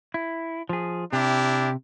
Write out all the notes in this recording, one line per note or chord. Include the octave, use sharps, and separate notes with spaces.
E4
F3 G#4
C3 D4 E4 G4